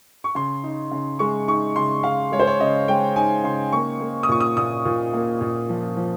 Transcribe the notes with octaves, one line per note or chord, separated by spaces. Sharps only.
C#6
C#3 C6
D#4
C#3
G#3 C#6
D#4 C#6
C#3 C6
C#3 F5
G#3 C#5
C5
C#5
C#3 D#5
G#3 G5
D#4 G#5
C#3 C6
A#3 C#6
A#3
D#6
A#2 C#6
D#6
A#2 D#6
A#2
A#3
A#2
F3
F3